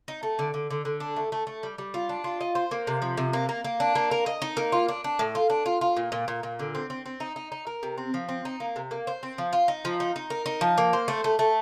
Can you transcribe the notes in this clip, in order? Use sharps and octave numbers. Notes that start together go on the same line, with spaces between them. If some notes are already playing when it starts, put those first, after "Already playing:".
D#4
A3
D3
D3
D3
D3
D4
A3
A3
A3
G3
G3
F4
D4
F4
D#5
C5
A#3
C3
F3
C3
A#3
A#3
A#3
D4
A#3
A#4
D#5
D#4
A#3
F4
D4
D4
A2
F4
D4
F4
F4
A#2
A#2
A#2
A#2
D3
C4
C4
C4
D#4
D#4
D#4
A#4
C3
C4
F3
C4
D#4
A#3
C3
A#3
C5
C4
F3
F4
D#4
F3
D#4
D#4
A#4
D#4
F3
A#3
C5
A3
A3
A3